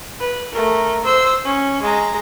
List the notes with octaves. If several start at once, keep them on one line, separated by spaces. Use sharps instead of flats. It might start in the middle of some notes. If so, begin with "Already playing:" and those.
B4
A3 A#4
C5 E6
C#4
G#3 A#5